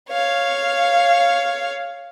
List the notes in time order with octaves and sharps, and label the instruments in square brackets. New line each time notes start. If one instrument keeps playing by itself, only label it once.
[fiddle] C#5 F5